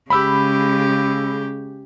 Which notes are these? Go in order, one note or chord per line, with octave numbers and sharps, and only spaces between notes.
C#3 G#3 G4 B5 E6